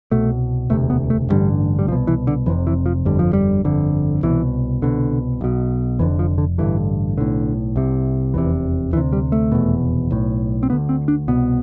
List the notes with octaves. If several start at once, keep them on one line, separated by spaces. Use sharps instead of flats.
C2 B2 A3
E1 D2 C3 A3
B3
A3
A1 G2 D3 G3
G3
C2 B2 F3
E3
D3
F1 F2 C3 E3
E3
F3
G1 F2 D3 G3
F3
G3
G1 F2 D3
C2 B2 E3
C2 B2 D3
B1 B2
F1 F2 D3 E3
F3
D3
A1 G2 D3 E3
B1 A2 D3
C2 C3
F1 E2 C3 E3
D2 C3 E3
G3
A3
F1 E2 B2
B1 A2
C4
D2 D3 B3
C4
D4
C2 B2 B3